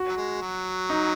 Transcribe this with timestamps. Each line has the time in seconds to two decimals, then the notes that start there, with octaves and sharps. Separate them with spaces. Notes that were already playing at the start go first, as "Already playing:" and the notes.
Already playing: F#4
0.09 F#3
0.17 G#3
0.41 F#3
0.90 D#4